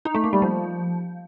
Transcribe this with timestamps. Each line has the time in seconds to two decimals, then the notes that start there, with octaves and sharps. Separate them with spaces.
0.05 D#4
0.15 A3
0.24 A#3
0.33 G3
0.42 F3